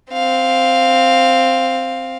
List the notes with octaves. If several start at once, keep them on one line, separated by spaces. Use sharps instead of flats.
C4 F5